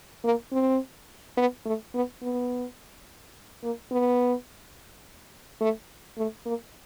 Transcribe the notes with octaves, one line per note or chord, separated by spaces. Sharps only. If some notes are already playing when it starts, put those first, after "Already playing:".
A#3
C4
B3
A3
B3
B3
A#3
B3
A3
A3
A#3